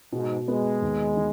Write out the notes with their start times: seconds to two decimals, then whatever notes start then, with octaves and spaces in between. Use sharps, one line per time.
0.12 G#2 B2
0.48 G#3 B3
0.82 D#2
1.16 D#3